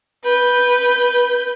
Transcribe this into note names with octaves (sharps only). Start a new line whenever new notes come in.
B4 G6